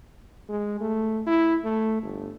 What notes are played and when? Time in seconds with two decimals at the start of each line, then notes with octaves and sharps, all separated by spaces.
0.49 G#3
0.80 A3
1.27 E4
1.65 A3
2.02 G1